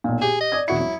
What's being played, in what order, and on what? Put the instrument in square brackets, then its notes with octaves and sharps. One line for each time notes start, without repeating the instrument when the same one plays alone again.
[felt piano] B1 A#2
[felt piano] G4 [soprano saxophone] G#4
[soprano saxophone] D#5
[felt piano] D5 D#6 G#6
[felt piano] E1 F#4 C#7 [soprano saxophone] E4
[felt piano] F#3